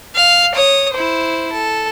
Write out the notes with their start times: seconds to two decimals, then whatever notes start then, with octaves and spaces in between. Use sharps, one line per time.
0.16 F5
0.55 C#5 D#6
0.94 E4 C5
1.53 A4